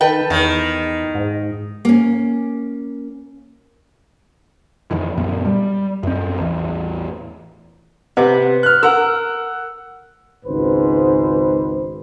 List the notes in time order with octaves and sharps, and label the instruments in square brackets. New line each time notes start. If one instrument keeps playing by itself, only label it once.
[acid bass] D#3 [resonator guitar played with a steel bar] A4 B4 G5
[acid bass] E2 [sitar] D#3
[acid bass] G#2
[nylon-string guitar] A#3 C#4
[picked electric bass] F2 D#3 E3
F#2 A#2 B3
G3
F#2 C4
A1 E2 E3
[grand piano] C3 [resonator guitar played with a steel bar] B3
[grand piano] F6 F#6
[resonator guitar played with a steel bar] A#4 [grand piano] F#5 E6
[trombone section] G#1 C#2 G#2 B4 C5